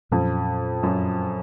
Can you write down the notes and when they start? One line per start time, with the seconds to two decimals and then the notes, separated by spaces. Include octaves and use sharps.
0.11 F2 A#2 F#3 C#4
0.83 F#2